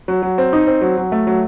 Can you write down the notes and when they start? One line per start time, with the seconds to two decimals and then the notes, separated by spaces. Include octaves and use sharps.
0.08 F#3
0.23 F#3
0.38 C4
0.53 D#4
0.67 C4
0.81 F#3
0.98 F#3
1.12 A3
1.27 F#3